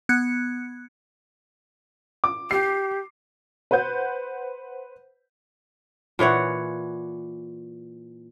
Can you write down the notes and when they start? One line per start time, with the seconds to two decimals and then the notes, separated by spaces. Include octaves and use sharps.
0.09 B3 F#6 G#6 C#7
2.24 D6
2.51 G4 C7
3.71 B4 C5 F#5 G6
6.19 A#2 E3 C#5 F#5